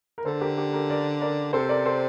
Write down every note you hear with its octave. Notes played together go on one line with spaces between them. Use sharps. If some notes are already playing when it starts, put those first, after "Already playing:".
A#4
D3 A4 C5
G4 A#4
G4 A#4
G4 A#4
A#4 D5
A#4 D5
C3 A4 C5
A#4 D5
A4 C5